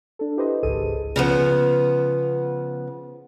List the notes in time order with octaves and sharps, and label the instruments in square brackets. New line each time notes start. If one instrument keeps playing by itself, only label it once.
[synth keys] D4 A4
E4 G4 B4 C5 D#5
G#1 C#2 G#2 G#4 A4 D#7
[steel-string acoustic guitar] C#3 F3 B3